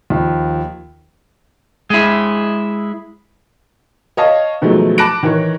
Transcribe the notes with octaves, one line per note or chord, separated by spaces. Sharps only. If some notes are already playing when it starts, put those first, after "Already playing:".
D#2 F3
G#3 E4
C#5 D#5 F5 A5
B2 D#3 F3 F#3 G#3 A3
A5 B5 D6 F#6 A#6 D7
D#3 E3 A#4 C#5